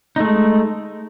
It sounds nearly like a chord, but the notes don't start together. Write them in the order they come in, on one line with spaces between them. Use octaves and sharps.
D#4 A3 G#3